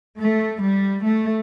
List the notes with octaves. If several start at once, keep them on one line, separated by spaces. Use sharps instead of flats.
A3
G3
A3